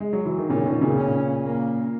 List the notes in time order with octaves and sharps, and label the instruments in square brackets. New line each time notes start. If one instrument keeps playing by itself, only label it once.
[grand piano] G#3
F#3
E3
D#3
[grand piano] A#2 C#3 [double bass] C#4
[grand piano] B2 D#3
A#2 C#3
[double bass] C#4
A#3